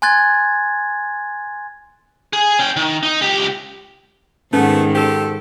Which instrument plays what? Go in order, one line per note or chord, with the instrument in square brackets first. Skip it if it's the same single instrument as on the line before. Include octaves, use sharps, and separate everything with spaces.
[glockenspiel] G#5 C6 F#6 G#6 A6
[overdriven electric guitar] G#4
C#4 G5
D#3
D#4
C#2 G4
[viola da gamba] G#2 D#3 [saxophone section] A3 B3 [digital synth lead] C#4
[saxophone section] G4 A4 C5